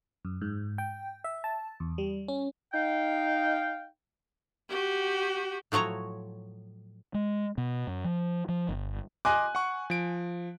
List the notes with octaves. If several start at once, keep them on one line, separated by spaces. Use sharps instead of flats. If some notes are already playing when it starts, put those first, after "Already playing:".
F#2
G#2
G5
E5
A5
E2
G3
C#4
D#4 F5 G5
F#4 G4
A2 F3 F#3 C#5 A#5
G#3
B2
F#2
F3
F3
G1
D#5 G#5 C6 D6 F#6
F#5 C#6
F3 D7